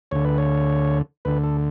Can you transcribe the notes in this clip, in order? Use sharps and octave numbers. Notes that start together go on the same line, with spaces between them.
D2 D3 C#5
B4
C#5
D2 D3 B4
A4